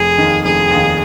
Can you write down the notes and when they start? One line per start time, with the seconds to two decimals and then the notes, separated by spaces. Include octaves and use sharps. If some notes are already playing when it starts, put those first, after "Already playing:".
Already playing: F1 G#4
0.18 D#2 D#3
0.44 F1 G#4
0.71 D#2 D#3